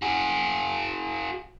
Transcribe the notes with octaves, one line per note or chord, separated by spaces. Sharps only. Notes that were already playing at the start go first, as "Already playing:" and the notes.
F#4 G#4